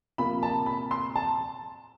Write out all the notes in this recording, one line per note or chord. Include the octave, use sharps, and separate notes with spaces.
C3 F3 A#3 B5
A5
B5
C6
A5